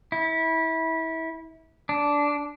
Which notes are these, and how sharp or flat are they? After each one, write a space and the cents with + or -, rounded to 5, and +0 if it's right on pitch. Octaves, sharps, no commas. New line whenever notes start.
E4 -25
D4 -10